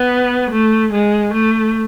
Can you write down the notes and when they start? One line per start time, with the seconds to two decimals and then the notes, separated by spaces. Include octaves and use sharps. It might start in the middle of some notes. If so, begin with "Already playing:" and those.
Already playing: B3
0.51 A3
0.92 G#3
1.34 A3